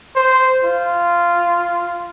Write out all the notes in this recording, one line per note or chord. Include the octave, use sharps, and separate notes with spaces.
C5
F4